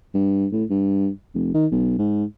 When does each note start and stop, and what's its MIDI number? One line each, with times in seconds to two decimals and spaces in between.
0.14 0.47 43
0.52 0.64 45
0.70 1.09 43
1.34 1.54 29
1.54 1.66 51
1.71 1.93 35
1.99 2.24 44